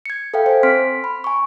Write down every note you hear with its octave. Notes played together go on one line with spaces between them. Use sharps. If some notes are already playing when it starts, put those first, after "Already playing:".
G#6 C#7
A4 B4 E5 F5 G5
C5 G#5
C4 C6 F6 B6 D7
B5
G#5 C#6